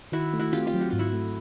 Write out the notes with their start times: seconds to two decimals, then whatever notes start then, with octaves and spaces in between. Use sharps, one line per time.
0.12 D#3 E4 F#4
0.34 A3
0.39 E4 F#4
0.53 C4 F4 G4
0.67 F4 G4
0.74 F#3
0.81 F#4
0.90 G#2 F4
0.99 E4 F#4
1.13 A3